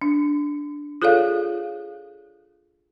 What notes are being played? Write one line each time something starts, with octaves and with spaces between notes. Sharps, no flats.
D4
F4 G#4 A4 C#5 D5 F5